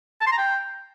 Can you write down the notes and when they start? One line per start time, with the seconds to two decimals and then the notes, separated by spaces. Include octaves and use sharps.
0.21 A5
0.27 C6
0.32 A#5
0.38 G5